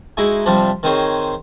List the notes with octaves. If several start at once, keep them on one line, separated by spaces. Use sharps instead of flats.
G#3 D#4 E4 F#4 G#4
C3 F3 G3 C4 D4
D#3 C4 D#4 G#4 C5 C#5